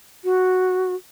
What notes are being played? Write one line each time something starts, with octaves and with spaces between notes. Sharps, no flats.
F#4